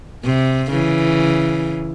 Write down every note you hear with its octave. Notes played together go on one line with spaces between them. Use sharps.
C3
C#3 E3